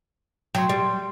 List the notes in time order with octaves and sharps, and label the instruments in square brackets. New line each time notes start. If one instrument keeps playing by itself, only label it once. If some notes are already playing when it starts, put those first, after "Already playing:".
[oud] F#3 [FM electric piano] G5 C6
[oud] G3